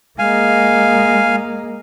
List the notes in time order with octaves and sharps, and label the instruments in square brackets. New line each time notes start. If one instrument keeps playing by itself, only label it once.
[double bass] G#3 A#3 [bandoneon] F5 G#5